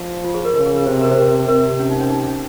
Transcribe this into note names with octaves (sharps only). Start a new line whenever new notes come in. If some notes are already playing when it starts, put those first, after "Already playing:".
Already playing: F3
F4
G#4
A#4
C#3 A#4
G#4
A#4
C3 C5
A#4
C5
C3 A#4
C3 A#4
C#4
D#4
C#4
D#4
C#4